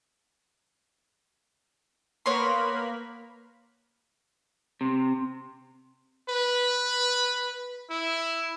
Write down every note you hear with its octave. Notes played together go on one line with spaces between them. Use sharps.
A#3 B3 A#4 C#5 B5 C6
C3
B4
E4